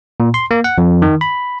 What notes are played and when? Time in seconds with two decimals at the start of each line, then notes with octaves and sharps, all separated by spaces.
0.20 A#2
0.34 C6
0.51 A#3
0.64 F#5
0.78 F2
1.02 D#3
1.21 B5